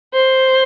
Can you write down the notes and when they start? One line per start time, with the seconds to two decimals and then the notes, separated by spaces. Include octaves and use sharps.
0.14 C5